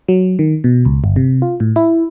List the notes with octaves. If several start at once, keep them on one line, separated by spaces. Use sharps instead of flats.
F#3
D#3
B2
C#2
G1
C3
F4
A2
E4